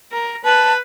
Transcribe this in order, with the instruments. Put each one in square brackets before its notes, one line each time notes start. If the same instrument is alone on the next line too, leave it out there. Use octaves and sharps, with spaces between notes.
[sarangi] A#4
[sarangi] B4 [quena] A5